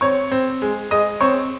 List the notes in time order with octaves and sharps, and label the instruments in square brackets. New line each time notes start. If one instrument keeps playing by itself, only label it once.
[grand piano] C4 C#5 C#6
C4
G#3
G#3 D#5 D#6
C4 C#5 C#6